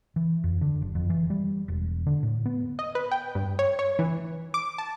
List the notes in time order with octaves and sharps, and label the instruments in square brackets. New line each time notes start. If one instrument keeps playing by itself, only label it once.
[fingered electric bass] E3
F2
D3
F#1
F2
E3
G3
E1
D3
A2
B3
[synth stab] D#5
B4
G5
G2
C#5
C#5
E3
D6
A5